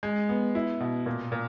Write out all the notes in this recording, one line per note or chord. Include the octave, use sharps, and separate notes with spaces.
G#3
B3
E4
B2
A#2
A#2